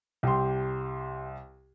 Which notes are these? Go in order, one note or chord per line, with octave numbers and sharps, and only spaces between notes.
C2 G4 C6